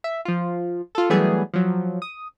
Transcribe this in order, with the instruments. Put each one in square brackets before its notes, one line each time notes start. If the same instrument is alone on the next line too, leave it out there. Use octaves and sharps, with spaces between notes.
[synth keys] E5
F3 F4
F4 A4
E3 F#3 G3 A3 B3 G#4
F3 F#3
D#6